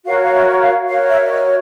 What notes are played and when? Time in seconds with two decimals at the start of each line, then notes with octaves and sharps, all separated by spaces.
0.05 F#4 A#4 C#5 F5
0.23 F5
0.33 E5
0.61 F5
0.88 F#4 A#4 C#5 F5
1.10 E5
1.25 D5
1.29 D#5